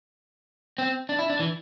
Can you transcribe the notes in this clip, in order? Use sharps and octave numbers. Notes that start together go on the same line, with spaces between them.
C4
D4
E4
D4
E3